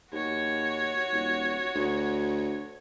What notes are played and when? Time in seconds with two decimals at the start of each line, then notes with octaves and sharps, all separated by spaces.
0.12 D#2 F#4 C#5
1.12 D#1
1.75 D2